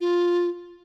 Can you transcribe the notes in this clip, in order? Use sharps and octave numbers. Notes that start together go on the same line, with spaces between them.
F4